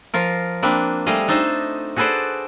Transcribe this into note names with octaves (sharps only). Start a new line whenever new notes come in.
F3 F4 A#4
A#3 C4 D4 B4
G3 A3 G#4 D#5 F5
D4 D#4 A4 C5 D#5
F#4 G#4 A4 B4 C5 D5